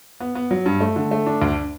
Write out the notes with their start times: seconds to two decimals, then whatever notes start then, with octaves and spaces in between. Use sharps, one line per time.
0.20 B3
0.35 B3
0.51 F#3
0.66 G2
0.81 A3
0.96 D3
1.11 A3
1.26 D4
1.42 D2